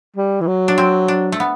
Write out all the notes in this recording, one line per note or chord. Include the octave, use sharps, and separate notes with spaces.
G3
E3
F#3
D4
C4
D4
A3
B3